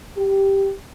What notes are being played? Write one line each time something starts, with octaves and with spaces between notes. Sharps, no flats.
G4